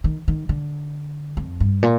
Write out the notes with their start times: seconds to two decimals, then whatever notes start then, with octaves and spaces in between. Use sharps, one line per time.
0.04 D#3
0.28 D#3
0.49 D3
1.37 F2
1.60 G2
1.83 A#2